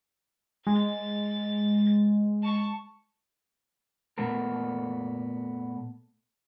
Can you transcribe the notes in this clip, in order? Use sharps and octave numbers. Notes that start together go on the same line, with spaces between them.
G#3 A6
A5 C#6
A#2 A3 B3 A4 A#4